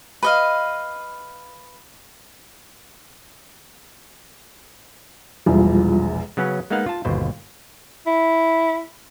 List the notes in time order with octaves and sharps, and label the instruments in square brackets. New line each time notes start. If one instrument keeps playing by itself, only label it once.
[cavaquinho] B4 D#5 F5
[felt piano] E1 A#1 E2 [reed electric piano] G3 F4
[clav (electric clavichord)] C#3 F#3 B3 C#4
G#3 A#3 B3 D#4 F5 F#5
F4 A5
G1 D#2 B2 C5
[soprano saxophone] E4